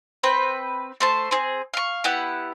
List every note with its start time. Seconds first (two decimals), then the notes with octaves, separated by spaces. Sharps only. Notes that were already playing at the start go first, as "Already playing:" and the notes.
0.23 C4 B4 G5
1.00 A3 C5 A5
1.31 C4 G#4
1.74 F5 C#6
2.04 B3 E4 G4 F#5